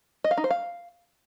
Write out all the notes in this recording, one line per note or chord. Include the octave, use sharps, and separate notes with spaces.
D#5
F5
D#4
C5
F5